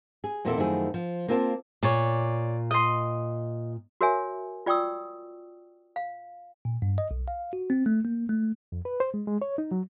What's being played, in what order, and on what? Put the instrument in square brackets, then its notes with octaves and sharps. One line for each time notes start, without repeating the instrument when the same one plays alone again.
[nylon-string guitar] G#4
E2 A#2 A#3 C4 E4 A4
F#2 D#3 F3 A3 E4 G#4
F3
A#3 C4 F4 A#4 G#5 A5
[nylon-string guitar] A#2 [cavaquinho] C#5 D5
[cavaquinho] D#5 C6
[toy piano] F#4 A#4 C#5 E5 G#5
F4 D5 G5 C#6 D#6 E6
F5
[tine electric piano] A#2
G2
D#5
B1
F5
F#4
C4
A3
A#3
A3
[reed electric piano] F2
B4
C5
G#3
G#3
C#5
D#4
F#3